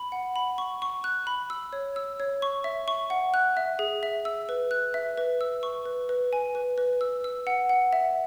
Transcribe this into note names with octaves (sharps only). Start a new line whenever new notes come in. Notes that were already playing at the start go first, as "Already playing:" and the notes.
Already playing: B5
F#5
B5
C#6
C#6
F#6
B5
E6
C#5
E6
C#5
C#6
E5
C#6
F#5
F#6
E5
G#4
E5
E6
B4
F#6
E5
B4
E6
C#6
B4
B4
G#5
B4
B4
E6
E6
F#5
F#5
E5